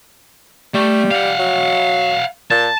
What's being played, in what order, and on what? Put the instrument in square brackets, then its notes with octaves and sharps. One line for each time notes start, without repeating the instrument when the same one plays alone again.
[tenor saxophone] G3 [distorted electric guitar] A3
[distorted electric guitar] F5 F#5
[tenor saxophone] F#3
[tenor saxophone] A#2 [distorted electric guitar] A5